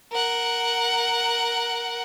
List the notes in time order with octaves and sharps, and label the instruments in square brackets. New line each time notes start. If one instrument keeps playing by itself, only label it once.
[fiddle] A#4 F#5